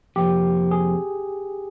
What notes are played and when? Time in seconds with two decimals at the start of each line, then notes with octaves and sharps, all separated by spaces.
0.16 F2 C3 F3 A#3 F4 G4
0.71 G#4